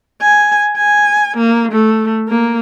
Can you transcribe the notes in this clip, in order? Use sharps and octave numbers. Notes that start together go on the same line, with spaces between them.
G#5
G#5
A#3
A3
A#3